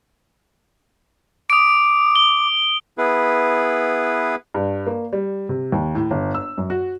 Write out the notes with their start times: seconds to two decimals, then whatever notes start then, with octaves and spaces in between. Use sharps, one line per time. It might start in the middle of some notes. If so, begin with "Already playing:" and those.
1.50 D6 D#6 D7
2.16 G7
2.98 B3 E4 G#4 B4
4.54 G2
4.87 A#3
5.13 G3
5.49 C3
5.72 D#2
5.95 A2
6.11 G1
6.35 E6
6.58 F#2
6.70 F#4